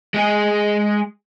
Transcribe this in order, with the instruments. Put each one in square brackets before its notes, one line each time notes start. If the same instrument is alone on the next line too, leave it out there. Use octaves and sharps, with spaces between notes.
[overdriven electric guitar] G#3 G#4